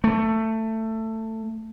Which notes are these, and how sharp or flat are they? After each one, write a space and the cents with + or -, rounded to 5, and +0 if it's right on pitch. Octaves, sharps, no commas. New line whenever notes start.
A3 +15